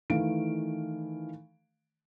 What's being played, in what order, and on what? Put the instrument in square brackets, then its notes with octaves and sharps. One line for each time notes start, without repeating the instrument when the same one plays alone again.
[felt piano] D#3 E3 A3 F5 D7